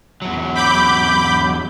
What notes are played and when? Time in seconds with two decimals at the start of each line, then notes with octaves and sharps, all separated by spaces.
0.22 E2 F#3
0.55 B5 D6 G6